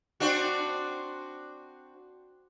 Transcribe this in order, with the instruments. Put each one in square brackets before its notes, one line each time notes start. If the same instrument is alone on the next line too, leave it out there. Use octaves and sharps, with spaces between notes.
[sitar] C4 D4 F#4